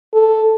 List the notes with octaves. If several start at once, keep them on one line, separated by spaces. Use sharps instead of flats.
A4